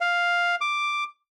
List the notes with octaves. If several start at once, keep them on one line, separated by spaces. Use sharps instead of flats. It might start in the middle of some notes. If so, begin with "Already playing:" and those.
F5
D6